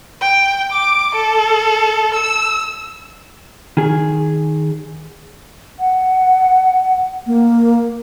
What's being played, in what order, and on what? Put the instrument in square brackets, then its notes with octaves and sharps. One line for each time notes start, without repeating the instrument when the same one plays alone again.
[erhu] G5
D6
A4
E6
[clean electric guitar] D#3 G#4
[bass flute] F#5
A#3